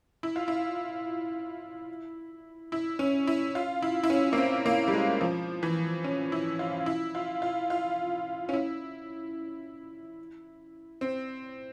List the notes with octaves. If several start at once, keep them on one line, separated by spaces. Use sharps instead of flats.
E4
F4
E4
E4
C#4
E4
F4
E4
E4
C#4
A#3
C4
A#3
G3
G#3
F3
E3
C#4
E4
F4
E4
F4
F4
F4
C#4
E4
C4